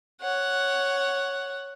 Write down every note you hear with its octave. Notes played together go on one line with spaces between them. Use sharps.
C#5 F#5